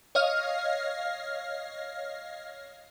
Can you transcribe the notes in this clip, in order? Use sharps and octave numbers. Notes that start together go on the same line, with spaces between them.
C#5 D#5 F5 F6